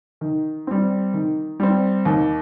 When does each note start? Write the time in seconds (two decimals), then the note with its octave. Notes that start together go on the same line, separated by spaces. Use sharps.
0.21 D#3
0.67 G3 C4
1.14 D#3
1.60 G3 C4
2.05 D#2